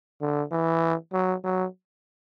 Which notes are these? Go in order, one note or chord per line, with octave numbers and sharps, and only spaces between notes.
D3
E3
F#3
F#3